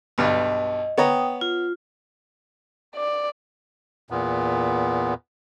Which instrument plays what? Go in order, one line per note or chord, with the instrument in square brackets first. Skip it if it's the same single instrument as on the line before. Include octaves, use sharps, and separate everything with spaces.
[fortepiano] B1 G2 [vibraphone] D#5
[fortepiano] B3 C#5 A#5 [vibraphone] G5 D#6
[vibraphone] F4
[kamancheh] D5
[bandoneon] E2 A#2 B3